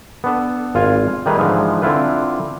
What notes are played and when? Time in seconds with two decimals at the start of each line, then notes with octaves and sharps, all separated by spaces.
0.24 B3 D4 A4
0.75 G#1 F4 F5 G#5
1.26 D#3 G3 A3 G#4 B4 A#5
1.38 G#2 D3 E3 F3 G#3
1.82 D3 C4 E4 F4 B4